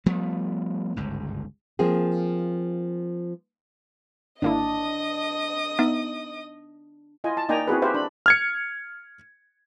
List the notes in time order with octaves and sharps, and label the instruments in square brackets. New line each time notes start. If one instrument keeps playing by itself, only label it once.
[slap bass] F3 G3 A3 B3
G1 C#2 G#2
[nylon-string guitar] F3 A#3 C4 G#4
[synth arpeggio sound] G#1 A#3 E4 [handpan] D4 [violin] D#5 D#6
[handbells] B3 D#4 [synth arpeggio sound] E5
[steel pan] E4 F4 D#5 G#5
A5
A#3 D#4 D5 G5 G#5 A#5
C4 E4 F#4 G#4 B4
G4 B4 C5 E5 F5
D4 B5
[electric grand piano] F6 G#6 C#7